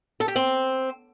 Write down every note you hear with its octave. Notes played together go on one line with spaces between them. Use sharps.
A4
G4
C4